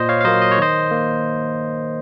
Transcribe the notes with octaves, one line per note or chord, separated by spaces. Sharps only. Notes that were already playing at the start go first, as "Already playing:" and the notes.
Already playing: A#2 C5 D#5
C#5 F5
F5
F#3 A#3 C5 D#5
D#5
C#5
D#3 C5 D#5
A#3